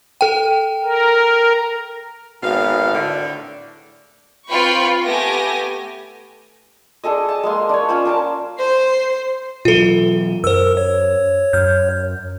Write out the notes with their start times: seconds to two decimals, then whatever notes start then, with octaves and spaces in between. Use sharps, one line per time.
0.21 A4 G5
0.84 A#4
2.42 G#1 B2 F5
2.92 A2 D3
4.50 C4 F4 B4 G5 B5 C#6
5.03 A3 B3 G4 A4 G#5 A#6
7.04 D4 G#4 A4 D#5
7.29 A5
7.43 G#3 A#3 C6
7.69 D4 C#5
7.89 C#4 F4 C5
8.05 D4 A#4 A5
8.59 C5 C7
9.65 B2 E3 F#3 F4 A4
10.44 F#2 A#4 C5 E6
10.77 C#5
11.53 F#2 F6 G6